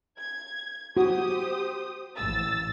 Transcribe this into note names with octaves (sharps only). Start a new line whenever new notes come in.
G#6
F#4 G4 C5 D#6
A1 E6 A6